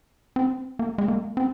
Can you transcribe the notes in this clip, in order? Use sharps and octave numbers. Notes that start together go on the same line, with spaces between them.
C4
A#3
G#3
A#3
C4